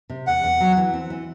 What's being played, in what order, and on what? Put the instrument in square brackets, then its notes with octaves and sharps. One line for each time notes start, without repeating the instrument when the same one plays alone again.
[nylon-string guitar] C3
[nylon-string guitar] E2 [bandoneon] F#5
[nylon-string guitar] E2
F#3
E3
C4
E3